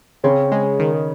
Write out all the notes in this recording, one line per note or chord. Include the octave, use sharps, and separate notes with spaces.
C#3 C4 C#4
G#3
D#3